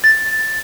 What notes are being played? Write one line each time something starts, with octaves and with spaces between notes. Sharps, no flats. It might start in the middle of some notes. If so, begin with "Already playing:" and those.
A6